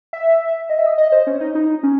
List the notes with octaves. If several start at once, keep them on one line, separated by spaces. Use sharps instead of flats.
E5
D#5
E5
D#5
D#5
C5
C#4
D#4
D#4
C#4